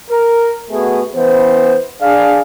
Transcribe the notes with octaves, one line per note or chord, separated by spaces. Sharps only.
A#4
A3 B3 F#4 G#4
E3 B3 C5
D4 G#4 D5 F5